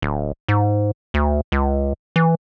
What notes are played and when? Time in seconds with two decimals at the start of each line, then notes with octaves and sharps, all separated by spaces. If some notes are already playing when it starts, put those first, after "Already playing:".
0.02 D1
0.49 G#2
1.14 D2
1.52 C#2
2.16 E3